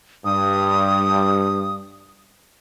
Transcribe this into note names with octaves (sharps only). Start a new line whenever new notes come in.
G2 D#6